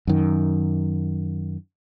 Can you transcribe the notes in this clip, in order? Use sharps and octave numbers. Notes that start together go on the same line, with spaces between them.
F#2 D#3